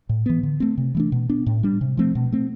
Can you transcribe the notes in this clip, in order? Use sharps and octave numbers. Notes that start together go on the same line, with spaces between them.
A2
E3 B3
D3
A3 C4
C3
E3 A3 D4
B2
B3 D4
A2
G3 D4
C3
F3 A3 C4
B2
A3 C4